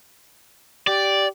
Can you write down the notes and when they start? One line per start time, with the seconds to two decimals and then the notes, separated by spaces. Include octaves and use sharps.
0.87 G4 D5